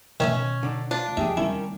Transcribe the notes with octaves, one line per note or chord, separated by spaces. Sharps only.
B2 D#3 C#4 E5 G#5
D3 D4 D#4
D4 F4
E2 F3 D#4 G4 G#4 E5
D#3 G3 A#3 C4 C#4 E4 A#4